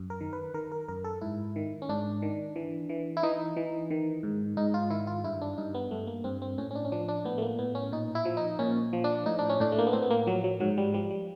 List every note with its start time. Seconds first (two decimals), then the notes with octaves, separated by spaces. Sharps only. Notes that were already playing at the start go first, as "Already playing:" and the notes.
Already playing: F#2
0.10 A#4
0.21 D#3
0.33 B4
0.54 D#3 A#4
0.72 A#4
0.88 F#2 A#4
1.04 A4
1.21 G#2 E4
1.56 D#3
1.82 C#4
1.89 G#2 D4
2.22 D#3
2.56 E3
2.89 E3
3.17 E4
3.23 E3 D#4
3.56 E3
3.91 D#3
4.23 G#2
4.57 G#2 D#4
4.74 F4
4.90 D#3 E4
5.07 F4
5.24 G2 E4
5.41 D4
5.58 G2 D#4
5.74 B3
5.91 G2 A3
6.07 A#3
6.24 G2 C4
6.42 C4
6.58 A2 C#4
6.71 C#4
6.75 D4
6.85 C#4
6.92 F3 D4
7.08 D4
7.25 A2 B3
7.38 A3
7.42 A#3
7.58 A2 B3
7.75 C#4
7.92 A#2 D#4
8.15 E4
8.25 F3
8.37 D#4
8.59 A#2 C#4
8.93 F3
9.04 D4
9.26 A2 D#4
9.39 D4
9.49 C#4
9.60 A2 D4
9.72 A3
9.79 A#3
9.87 B3
9.93 A2 C4
10.02 B3
10.10 A#3
10.26 F3 F#3
10.44 F#3
10.60 G#2 F#3
10.77 G3
10.93 F3 G3
11.10 G3